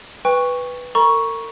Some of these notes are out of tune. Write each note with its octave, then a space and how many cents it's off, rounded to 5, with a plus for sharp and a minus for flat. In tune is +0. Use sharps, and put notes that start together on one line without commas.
B4 +0 G5 +35 C#6 +0
A#4 -40 A#5 +35 C#6 +0